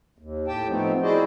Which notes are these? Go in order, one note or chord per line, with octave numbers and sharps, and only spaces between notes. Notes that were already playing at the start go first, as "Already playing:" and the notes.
D#2
A2 G4 G5 A5
F3 A3 B3 C4 D#4
E4 F#4 G#4 C5 D5 D#5